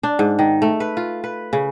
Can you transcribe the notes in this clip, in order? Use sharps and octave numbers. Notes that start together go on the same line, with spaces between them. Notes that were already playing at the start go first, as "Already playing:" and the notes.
D4
G#2
D#3
A3
B4
F4
B4
C#3